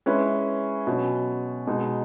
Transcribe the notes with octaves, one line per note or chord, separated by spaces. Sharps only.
G#3 C#4 E4 B4
B2 F#3 C#4
B2 G#3 D#4